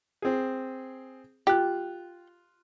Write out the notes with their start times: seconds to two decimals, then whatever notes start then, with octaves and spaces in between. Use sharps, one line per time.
0.22 C4 G#4
1.47 F4 G4 F#6